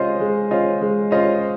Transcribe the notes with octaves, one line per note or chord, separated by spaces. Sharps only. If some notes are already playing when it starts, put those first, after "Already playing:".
Already playing: G#3 C#4 F4 C5 D#5
G#3
C#4 F4 C5 D#5
G#3
C#4 F4 C5 D#5